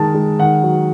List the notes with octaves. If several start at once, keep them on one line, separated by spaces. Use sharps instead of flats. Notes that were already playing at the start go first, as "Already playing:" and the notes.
Already playing: D#3 G#3 A5
G#3
D#3 F#5
F#3